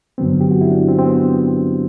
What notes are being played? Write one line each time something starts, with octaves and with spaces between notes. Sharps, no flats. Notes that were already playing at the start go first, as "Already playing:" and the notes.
G2 D3 F#3 B3 C4
G4
F#4
E4
D4
C4
C4
B3